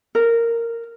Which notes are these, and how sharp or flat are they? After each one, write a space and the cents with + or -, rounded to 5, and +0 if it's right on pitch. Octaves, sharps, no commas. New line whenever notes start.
A#4 -10